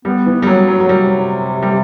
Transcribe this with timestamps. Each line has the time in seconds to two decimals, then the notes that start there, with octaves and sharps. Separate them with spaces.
0.05 G3 B3
0.26 E3
0.42 G3
0.47 F#3
0.68 F#3
0.80 F#3
0.89 C3 G3
1.62 G3